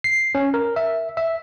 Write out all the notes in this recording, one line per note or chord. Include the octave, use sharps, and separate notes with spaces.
C7
C#4
A#4
E5
E5